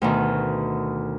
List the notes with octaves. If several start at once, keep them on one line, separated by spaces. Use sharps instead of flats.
D2 B2 D#3